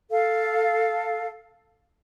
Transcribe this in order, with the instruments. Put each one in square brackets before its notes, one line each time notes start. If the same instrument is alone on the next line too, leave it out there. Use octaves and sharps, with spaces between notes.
[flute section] A4 F5